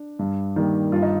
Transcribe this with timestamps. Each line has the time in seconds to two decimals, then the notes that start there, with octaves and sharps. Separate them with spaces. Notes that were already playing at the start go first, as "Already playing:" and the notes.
Already playing: D4
0.19 G2
0.56 D#3 G3 A#3
0.92 G2 F4
1.02 D#4